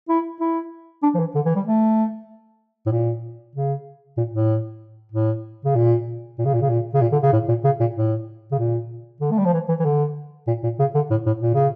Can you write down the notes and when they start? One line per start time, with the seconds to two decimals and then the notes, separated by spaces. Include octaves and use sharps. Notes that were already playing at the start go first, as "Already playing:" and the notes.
0.09 E4
0.40 E4
1.03 D4
1.15 F3
1.19 E3
1.35 D3
1.46 E3
1.56 G3
1.67 A3
2.86 A2
2.92 A#2
3.55 C#3
4.18 A#2
4.33 A2
5.12 A2
5.65 C#3
5.75 A#2
6.38 A#2
6.45 C#3
6.54 A#2
6.61 C#3
6.69 A#2
6.94 C#3
7.01 A#2
7.12 D3
7.23 C#3
7.33 A2
7.48 A#2
7.64 C#3
7.80 A#2
7.96 A2
8.52 C#3
8.59 A#2
9.21 D3
9.31 A3
9.38 G3
9.45 F3
9.53 E3
9.69 E3
9.80 E3
9.85 D3
10.47 A#2
10.63 A#2
10.79 C#3
10.95 D3
11.10 A2
11.26 A2
11.41 A#2
11.54 C#3